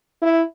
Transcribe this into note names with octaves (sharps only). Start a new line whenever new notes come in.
E4